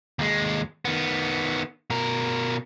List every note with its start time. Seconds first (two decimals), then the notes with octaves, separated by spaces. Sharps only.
0.19 D#2 G#3
0.85 D#3 B3
1.90 B2 A#4